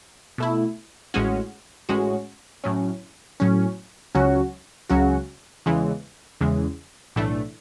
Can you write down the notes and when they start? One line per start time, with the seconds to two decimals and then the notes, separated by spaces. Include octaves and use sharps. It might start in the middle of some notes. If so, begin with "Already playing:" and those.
0.38 B2 A3 E4
1.14 A1 A2 G#3 C#4 F#4
1.89 A1 A2 G#3 C#4 F#4
2.64 A2 F#3 C#4
3.40 A2 F#3 C#4
4.15 C#2 C#3 F#3 C#4 F#4
4.89 C#2 C#3 F#3 C#4 F#4
5.66 E2 C#3 E3 G#3
6.41 E2 C#3 E3 G#3
7.16 B1 A2 E3 A3 D4